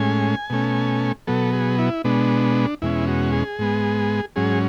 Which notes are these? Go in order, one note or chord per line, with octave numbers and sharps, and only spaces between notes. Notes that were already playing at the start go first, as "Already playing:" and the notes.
Already playing: A2 G#3 C#4 G#5
B2 A3 C#4
B2 F#3 B3 A4
G#4
E4
B2 G#3 B3 D4
E2 B2 G#3 C#4 E4
F#4
G#4
G#2 G#3 B3
G#2 F#3 C#4 G#4